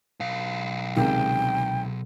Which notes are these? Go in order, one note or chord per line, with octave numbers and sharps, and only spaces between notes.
B1 F5
C#2 C3 D#3 G5